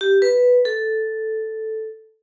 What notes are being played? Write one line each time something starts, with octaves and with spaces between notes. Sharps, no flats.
G4
B4
A4